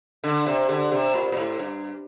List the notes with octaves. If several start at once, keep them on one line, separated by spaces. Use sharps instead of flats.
D3
C3
D3
C3
A#2
A#2
A2
G2